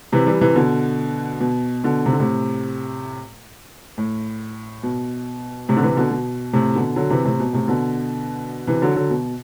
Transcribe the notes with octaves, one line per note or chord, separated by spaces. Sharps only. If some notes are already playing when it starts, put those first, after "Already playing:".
C3 E3
E3 G3
C3 E3
B2 D3
B2
B2 D3
C3
D3
A2 C3
A2
B2
A2 C3
D3
C3 E3
B2 D3
B2
A2 C3
B2 D3
D3 F#3
C3 E3
A2 C3
B2
A2 C3
B2 D3
C3 E3
D3 F#3
D3 F#3
B2